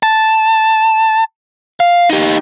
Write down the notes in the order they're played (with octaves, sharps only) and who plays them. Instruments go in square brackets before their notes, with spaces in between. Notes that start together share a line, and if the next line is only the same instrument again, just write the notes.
[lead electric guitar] A5
F5
D#4 G4